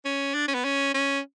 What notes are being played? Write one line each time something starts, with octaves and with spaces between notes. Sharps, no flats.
C#4
D4
C#4
B3
C#4
C#4